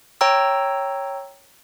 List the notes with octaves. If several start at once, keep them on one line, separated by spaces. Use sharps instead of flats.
C#5 G5 A#5 E6